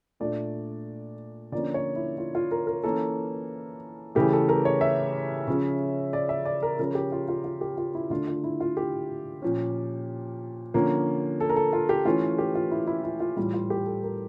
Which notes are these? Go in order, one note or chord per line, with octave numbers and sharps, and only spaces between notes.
A#2 A3 D4 D5
D3 F3 A#3 C#4 D5
C#5
E4
F4
F4
A#4
A#4
E3 A#3 C#4 A4
C#3 E3 A3 G4
A4
A#4
C#5
E5
C#3 F3 C#4
D5
E5
D5
A#4
C#3 F3 C#4 A#4
G4
F4
F4
F4
G4
F4
E4
D3 A3 D4 F4
F4
E4
F4
G4
A#2 F3 C#4
D3 F3 A#3 C#4
A4
A#4
A4
F4
G4
E3 A3 C#4 F4
G4
F4
E4
E4
E4
F4
A2 E3 G3 F4
F4
G4
A4
A#4